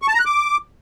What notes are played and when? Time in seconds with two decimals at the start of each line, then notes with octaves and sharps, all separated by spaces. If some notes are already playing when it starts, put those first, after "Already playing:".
0.02 C#6
0.08 A5
0.14 A#5
0.20 F#6
0.25 D6